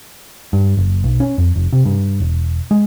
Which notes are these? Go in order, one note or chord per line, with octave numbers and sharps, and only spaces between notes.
G2
F#1
B1
C#4
F2
F1
C3
G2
E1
G#3